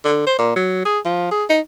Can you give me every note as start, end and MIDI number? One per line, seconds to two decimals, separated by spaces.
0.05 0.22 50
0.27 0.35 72
0.39 0.55 46
0.56 0.84 54
0.85 0.99 68
1.05 1.29 53
1.31 1.45 68
1.50 1.60 63